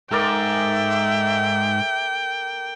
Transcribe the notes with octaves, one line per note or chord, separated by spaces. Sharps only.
G#2 A4 A#4 D5 E5 G5